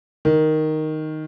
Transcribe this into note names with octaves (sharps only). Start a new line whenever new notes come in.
D#3